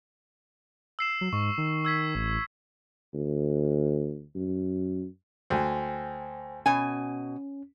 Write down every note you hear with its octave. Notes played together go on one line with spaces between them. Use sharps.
E6 C7 E7
F#3
G#2 C#6
D#3
E6 G#6 B6
A1
D2
F#2
D2 C5 G5 G#5
B2 C#4 G#5